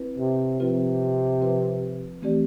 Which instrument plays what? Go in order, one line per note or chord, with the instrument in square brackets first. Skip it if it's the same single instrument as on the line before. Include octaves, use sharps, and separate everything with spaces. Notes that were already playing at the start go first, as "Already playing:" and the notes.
Already playing: [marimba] C4 E4 B4
[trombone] C3
[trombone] C3 [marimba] F3 C4 F4 B4
[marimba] F3 C4 F4 B4
E3 A3 C4 G4 D5